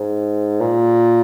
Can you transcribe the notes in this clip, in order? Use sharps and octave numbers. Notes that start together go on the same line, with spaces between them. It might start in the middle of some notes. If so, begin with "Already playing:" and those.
Already playing: G#2
A#2